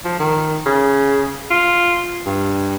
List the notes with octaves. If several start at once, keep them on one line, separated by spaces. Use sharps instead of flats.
F3
D#3
C#3
F4
G2